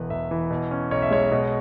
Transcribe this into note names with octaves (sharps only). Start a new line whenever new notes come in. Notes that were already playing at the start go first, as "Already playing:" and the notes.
Already playing: E1 E2 B4
E1 E5
E3
B2
C#4
B1 C#5
E5
G#3 C#5
B2